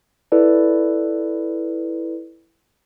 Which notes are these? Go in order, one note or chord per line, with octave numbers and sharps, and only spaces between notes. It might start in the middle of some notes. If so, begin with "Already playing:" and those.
E4 A4 B4 D5